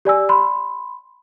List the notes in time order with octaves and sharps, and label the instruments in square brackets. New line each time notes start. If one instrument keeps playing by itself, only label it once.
[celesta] G4 D5 G#5 E6
B5 C6